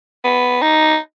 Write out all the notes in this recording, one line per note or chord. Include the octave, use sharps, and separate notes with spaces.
B3
D#4